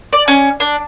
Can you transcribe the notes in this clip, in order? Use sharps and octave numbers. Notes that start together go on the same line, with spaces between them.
D5
C#4
D4